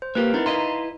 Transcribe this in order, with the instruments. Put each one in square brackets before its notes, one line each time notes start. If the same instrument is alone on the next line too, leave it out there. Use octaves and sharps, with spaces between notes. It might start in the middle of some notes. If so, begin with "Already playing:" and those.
[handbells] C5
[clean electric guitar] A#3 F4 G4 [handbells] A#4 B4
[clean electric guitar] B3 C4 [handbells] D#4 E4
[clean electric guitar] E4 B4 D#5 [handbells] F5 A#5 C6